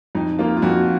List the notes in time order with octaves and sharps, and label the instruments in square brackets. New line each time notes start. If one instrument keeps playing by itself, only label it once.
[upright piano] F2 [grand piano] D#4
[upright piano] A#3 [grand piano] F4
[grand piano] F4
[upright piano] F2 [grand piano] F#4